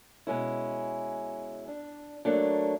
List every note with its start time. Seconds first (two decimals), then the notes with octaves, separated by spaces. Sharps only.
0.27 B2 G#3 C#4 E4
1.68 D4
2.25 F#3 A3 A#3 D4